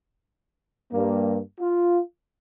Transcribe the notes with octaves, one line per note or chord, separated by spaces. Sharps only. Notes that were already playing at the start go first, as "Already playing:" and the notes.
G2 G3 A#3
F4